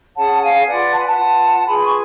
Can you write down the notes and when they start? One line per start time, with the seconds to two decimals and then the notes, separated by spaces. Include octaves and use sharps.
0.16 C#4 G#4 C#5 F#5 A5
0.41 F5 G#5
0.65 F4 B4 D5 F#5
0.91 A5
0.99 G#5
1.05 F#5 A5
1.15 F4 B4
1.65 F4 G#4 B4 G#5 B5
1.85 C#6
1.90 G#5